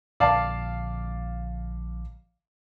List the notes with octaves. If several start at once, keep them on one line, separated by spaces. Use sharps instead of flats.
A#1 D3 D5 F5 A5